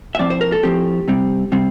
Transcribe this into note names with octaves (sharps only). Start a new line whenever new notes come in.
E5
A2 F3 C4 D5
C5
A#4
A4
A2 F3 C4 G4
C3 G3 C4
C3 G3 C4